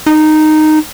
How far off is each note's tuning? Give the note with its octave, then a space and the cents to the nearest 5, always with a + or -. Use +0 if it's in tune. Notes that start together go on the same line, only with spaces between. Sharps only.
D#4 -10